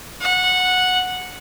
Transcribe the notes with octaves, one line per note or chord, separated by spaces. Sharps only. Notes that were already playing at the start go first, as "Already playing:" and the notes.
F#5